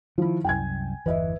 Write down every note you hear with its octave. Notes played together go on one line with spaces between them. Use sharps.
D#3 F3 E4
C2 F#2 G5 G#5 G#6
G1 E2 E3 B4 D#5 E5